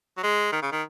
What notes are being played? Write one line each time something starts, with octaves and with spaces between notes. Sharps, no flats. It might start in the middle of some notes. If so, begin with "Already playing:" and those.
F#3
G#3
D#3
C#3
D#3